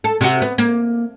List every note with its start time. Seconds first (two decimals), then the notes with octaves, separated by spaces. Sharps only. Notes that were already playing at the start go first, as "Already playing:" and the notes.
0.04 A4
0.21 C3 F#4
0.42 B3
0.58 A#3